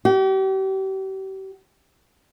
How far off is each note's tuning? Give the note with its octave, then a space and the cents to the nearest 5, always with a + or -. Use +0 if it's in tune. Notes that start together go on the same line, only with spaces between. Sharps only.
G4 -40